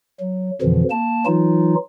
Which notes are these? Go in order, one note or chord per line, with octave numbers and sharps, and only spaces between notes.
F#3
F2 B2 D3 E3 F3
A#3 A5
E3 F#3 D#4 F4